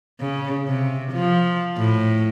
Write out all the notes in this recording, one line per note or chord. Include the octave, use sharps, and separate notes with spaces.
C#3
C3
F3
A2